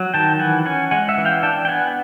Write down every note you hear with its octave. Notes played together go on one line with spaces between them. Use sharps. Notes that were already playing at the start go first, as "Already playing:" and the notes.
Already playing: F#3
D#3 G5 A5
E3 F#5 G#5
C#4 F#5 G#5
G#3 F#5 G#5
E5 F#5
E3
F5 G5
D4 G5 A5
G5
B3 F#5 G#5